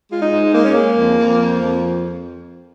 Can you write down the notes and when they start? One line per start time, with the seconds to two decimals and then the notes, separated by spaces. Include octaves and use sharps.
0.11 G#3 F4
0.22 D#4
0.33 G#2
0.54 G#3 A#3
0.64 C#4
0.75 G#3 A#3
0.97 F2
1.19 F2
1.40 F3
1.62 F2